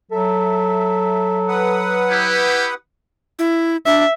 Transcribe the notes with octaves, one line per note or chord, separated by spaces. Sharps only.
F#3 A4 E5
B4 F#5 D#6
E4 G4
E4
D4 E5